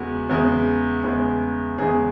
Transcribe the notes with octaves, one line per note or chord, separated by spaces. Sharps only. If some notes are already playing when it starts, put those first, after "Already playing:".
Already playing: E2 C#3 G#3 B3 F#4
E2 C#3 G#3 B3
E2 C#3 G#3 B3
E2 C#3 G#3 B3 G#4